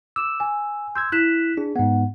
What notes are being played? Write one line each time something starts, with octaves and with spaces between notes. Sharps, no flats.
D6 E6 E7
G#5
C6 E6 G6 G#6
E4 F#6 B6 E7
D4 G#4
G#2 B3 F#5